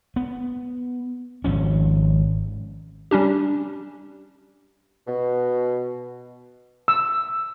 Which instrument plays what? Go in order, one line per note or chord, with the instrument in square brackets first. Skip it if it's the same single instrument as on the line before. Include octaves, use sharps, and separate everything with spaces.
[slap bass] B3
G#1 F3 C#4
[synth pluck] G3 C#4 D4 G4
[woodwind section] B2
[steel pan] E6